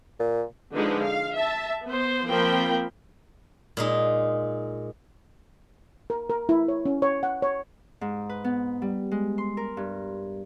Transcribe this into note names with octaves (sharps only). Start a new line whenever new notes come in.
A#2
D3 F3 G#3 D#4 B4
F5
E5 A5
B3 C5
F3 A#3 C4 A#4 G5 B5
A#2 G#3 D#4
A#4
A#4
E4
C#5
C#4
C#5
F#5
C#5
G#2
B4
B3
G3
G#3
C6
A#4
G2